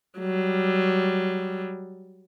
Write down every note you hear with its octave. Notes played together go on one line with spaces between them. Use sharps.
F#3 G3